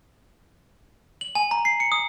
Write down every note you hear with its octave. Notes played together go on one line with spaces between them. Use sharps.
F#7
G#5
A#5
C7
C#7
D#6